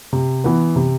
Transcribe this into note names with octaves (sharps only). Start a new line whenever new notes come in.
C3
E3 B3
C3